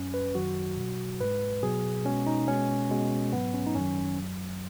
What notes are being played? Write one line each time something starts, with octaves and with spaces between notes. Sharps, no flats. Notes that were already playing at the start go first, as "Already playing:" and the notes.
Already playing: F#2 F#3 C#4
B4
F#2 D#3 F#3 F#4
B2 F#3
G#2 G#3 B4
B2 F#3 G#4
B2 G#3 C#4
D#4
B2 G#3 C#4
B2 G#3
G#2 F#3 B3
C#4
D#4
F#2 D#3 F#3 C#4
F#2 F#3